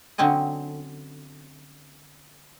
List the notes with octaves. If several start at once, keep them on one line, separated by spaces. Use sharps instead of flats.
D3 F#3 C4 C#4 D#5